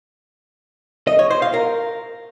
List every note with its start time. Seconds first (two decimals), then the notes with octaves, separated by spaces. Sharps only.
1.07 D#5
1.19 C#5
1.30 C5
1.42 F5
1.54 A#4